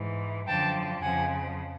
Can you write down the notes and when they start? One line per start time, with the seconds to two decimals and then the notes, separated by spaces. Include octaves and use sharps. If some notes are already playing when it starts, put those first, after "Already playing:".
Already playing: G#2 E3
0.46 F#2 D3 F3 G5 A5
1.02 F2 C#3 F3 F#5 G#5